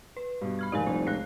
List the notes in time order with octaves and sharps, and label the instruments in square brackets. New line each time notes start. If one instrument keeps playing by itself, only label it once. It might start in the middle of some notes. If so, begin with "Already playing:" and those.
[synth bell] B4
[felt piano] G2 B2
[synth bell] B5 F6 G#6
[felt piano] F1 G#2 [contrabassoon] D#2 [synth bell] D5 F5 G#5
[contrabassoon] F1 [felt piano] C2 [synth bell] C5
[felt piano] C#2 [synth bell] F#6 A#6 C7